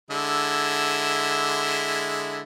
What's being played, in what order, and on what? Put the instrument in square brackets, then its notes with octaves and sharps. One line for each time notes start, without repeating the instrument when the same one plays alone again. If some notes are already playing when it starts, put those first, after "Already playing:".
[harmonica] D3 G#3 E4